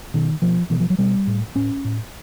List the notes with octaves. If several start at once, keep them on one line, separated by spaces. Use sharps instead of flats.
B2 D#3
B2 F3
B2 E3
F3
F#3
B2 G3
A2
A2 C#4
A2